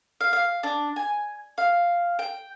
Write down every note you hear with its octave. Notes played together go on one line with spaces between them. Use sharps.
F5
F5
D4
G#5
F5
G5